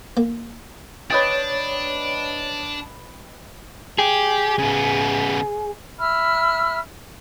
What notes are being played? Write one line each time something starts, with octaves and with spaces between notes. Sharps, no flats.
A#3
D4 B4 C#5 D#5 G5 A6
G4 G#4
C#3 B3
E5 B5 E6 F6